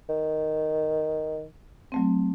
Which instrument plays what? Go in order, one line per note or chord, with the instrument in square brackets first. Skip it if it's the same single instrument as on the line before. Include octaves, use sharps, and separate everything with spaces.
[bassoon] D#3
[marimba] F#3 A3 C4